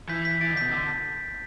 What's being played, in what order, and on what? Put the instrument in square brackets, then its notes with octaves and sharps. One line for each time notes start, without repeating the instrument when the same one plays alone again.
[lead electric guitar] E3 [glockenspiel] G6 B6
[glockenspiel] G6 B6
[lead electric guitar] E3 [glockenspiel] A6 D7
[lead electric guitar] D3
[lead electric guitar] B2 [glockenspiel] G6 B6
[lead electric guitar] D3